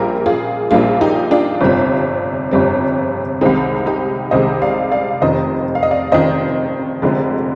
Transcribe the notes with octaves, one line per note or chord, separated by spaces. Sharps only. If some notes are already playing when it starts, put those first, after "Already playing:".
Already playing: A#1 A#2 G3 A#3 G4 A#4
F4 G#4
A#1 A#2 G3 A#3 D4 F4
D#4 G4
D4 F4
G1 F2 C3 G3 C4
G1 F2 C3 G3 C4
C2 C3 D#3 G#3 C4 D#4
D#4 G4
C2 C3 D#3 G#3 C5 D#5
D5 F5
D5 F5
F1 F2 D#3 C5 D#5
F5
D#5
D5 F5
F1 F2 D#3 C5 D#5
F1 F2 D3 G#3